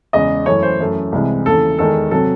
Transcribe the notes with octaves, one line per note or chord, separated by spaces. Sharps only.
E2 C#3 G#3 D#5
F#2 E3 A3 C#5
C5
F#2 E3 A3
C2 C3 E3 G#3
D#2 C#3 E3 A3 A4
E2 D#3 G#3 A4
C3 F#3 A4